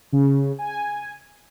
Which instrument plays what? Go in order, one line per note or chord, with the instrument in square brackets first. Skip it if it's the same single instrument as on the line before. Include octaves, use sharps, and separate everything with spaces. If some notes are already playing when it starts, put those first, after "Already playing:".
[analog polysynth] C#3
G#5